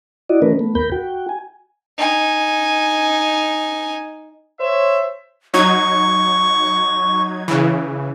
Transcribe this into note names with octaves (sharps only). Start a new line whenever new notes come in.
E4 F#4 D5 D#5
E3 A3 C#4 A#4 B4
A3 B3
D#2 A#4 B5 G6
F#4 G5
G#5
D#4 G#5
C5 C#5 E5
F#3 D#4 C#6 G#6
C#3 E3